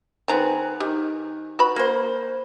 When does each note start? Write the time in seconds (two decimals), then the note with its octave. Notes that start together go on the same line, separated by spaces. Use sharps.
0.28 D#3 B3 C4 G#4 A#5
0.80 D#3 G4
1.59 F#4 B4 B5
1.76 A#3 C5